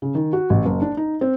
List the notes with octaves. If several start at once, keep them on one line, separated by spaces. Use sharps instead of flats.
C#3
D#3
F#4
A1
F#1
D4
D#4
C4